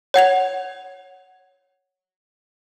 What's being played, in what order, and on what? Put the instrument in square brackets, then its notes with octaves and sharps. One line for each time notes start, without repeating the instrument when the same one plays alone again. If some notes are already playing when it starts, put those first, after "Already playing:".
[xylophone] C#5 F#5 G#6 F7